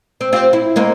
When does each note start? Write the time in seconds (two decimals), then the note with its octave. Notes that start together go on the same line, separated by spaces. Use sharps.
0.21 C4
0.33 C4 F4 G4
0.53 E4
0.76 G#3 A#3 C4